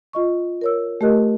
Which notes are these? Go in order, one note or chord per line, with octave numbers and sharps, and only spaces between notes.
F4 D#5 C#6
A#4 C#5 E6
A3 G4 A#4 D#5 F#6